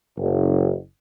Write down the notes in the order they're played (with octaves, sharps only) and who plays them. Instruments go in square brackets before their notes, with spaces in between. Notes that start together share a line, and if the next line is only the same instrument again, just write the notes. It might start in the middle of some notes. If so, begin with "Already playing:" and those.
[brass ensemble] F#1